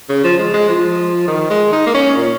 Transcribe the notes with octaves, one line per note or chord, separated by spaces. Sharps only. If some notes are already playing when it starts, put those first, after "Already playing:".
C#3
F3
G#3
G#3
F3
D#3
G#3
D#4
A#3
C#4
A#2